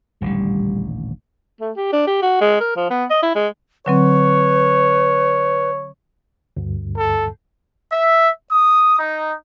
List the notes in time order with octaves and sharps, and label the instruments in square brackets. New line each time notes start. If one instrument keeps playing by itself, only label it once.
[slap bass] D#1 A1 D3 [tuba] G3
[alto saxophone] A3
G4
D4
G4
F#4
G#3
A#4
F3
B3
D#5
E4
G#3
[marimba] D3 F#3 C4 [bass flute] B4 [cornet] C#5
[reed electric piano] D2 G2
[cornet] A4
[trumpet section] E5
D#6
D#4